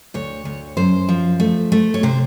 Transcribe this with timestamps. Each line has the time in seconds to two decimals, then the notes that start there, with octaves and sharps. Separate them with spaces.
0.14 D2 C#5
0.45 D2
0.77 F#2 C5
1.09 F3
1.40 A3
1.72 A3
1.94 C#5
2.03 C3 C5